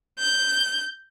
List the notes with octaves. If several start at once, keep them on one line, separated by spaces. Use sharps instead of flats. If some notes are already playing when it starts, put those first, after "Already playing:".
G6